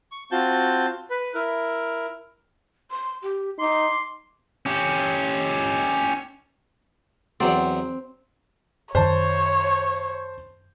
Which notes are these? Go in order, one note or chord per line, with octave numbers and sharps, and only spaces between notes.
C#6
C4 F4 F#4 A5 G6
B4
E4 A#4
C6
G4
D#4 C6 D6
C#4 G4
E2 F#3 C4 D5
F#2 D#3 C5 C#5 A5